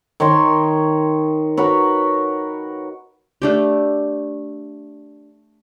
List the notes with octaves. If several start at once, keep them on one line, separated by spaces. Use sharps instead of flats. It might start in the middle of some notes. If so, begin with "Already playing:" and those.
D#3 C#5 D#5 C6
F#4 A#4 B4 C#5
A3 D4 G4